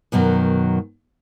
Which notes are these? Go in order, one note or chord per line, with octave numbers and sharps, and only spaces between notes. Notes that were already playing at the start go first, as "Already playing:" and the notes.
F#2 B2 D#3 F#3